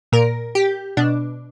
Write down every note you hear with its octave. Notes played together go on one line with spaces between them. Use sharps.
A#2 A#4
G4
B2 D4